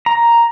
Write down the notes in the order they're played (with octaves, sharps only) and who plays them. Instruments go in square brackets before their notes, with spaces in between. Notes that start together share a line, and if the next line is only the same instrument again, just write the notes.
[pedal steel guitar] A#5